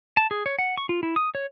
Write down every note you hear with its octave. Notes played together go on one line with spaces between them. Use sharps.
A5
G#4
C#5
F#5
C#6
F4
E4
D#6
C#5